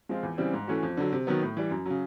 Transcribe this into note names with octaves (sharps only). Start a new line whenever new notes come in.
F3 G#3 C4 F4
E2
C#3 E3 G3 C4
G#2
E3 A3 C#4 F#4
F2
D3 F#3
C3
D#3 F#3 B3
A2
E3 G3
F#2
C#3 F#3